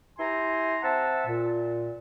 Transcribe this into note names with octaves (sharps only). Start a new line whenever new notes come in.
E4 G4 G#5 A#5 C6
C4 E5 F#5 A5
A#2